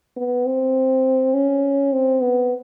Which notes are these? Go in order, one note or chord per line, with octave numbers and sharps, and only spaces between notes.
B3
C4
C#4
C4
B3